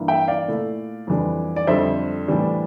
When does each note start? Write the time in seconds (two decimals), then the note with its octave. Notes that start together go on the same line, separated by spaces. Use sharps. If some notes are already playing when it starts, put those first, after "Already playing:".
Already playing: G2 E3 A#3 E4
0.08 E5 G5
0.28 D5 F5
0.48 A#2 A3 E4
1.07 F2 E3 G3 D4
1.56 D5
1.67 F2 D3 G3 C5 E5
2.28 A2 E3 G3 D4